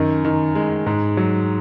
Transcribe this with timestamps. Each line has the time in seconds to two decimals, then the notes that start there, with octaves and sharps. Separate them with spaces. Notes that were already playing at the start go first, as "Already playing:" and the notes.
Already playing: F#2 D#3
0.25 D#3
0.55 G#3
0.86 G#2
1.17 F#3